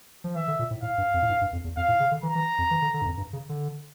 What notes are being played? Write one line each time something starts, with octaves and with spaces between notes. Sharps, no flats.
F3
E3 E5
D3
A#2
A2
A2 F5
G2
F2
A2
G2
G2
F2
E2
F2 F5
A2
C#3
D3
E3 A#5
E3
F2
E3
D3
D3
G2
F2
G2
C#3
D3